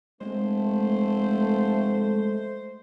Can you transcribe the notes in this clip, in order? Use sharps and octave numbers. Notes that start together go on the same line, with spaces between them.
F1 G#3 A3 C5